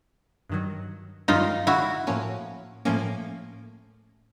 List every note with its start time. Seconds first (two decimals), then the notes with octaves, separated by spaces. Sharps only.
0.49 G2 D#3 F#3
1.28 G2 D#3 F#3 D#4 F4
1.67 E4 F#4
2.07 A2 F3 A#3 C#4
2.85 A2 F3 A#3 C#4